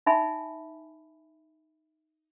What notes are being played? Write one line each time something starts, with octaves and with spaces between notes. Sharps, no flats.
D#4 E5 G#5 B5